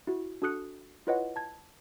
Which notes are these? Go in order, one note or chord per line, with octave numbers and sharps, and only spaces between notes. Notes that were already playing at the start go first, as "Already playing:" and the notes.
E4 F#4
D4 F#4 A4 D#6 F#6 C#7
E4 F4 B4 C#5 D#5 F#5
A5 G#6